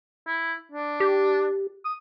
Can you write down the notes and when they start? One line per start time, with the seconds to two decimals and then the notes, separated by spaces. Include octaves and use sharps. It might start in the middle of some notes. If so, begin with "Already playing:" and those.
0.27 E4
0.72 D4
1.00 G4
1.85 D#6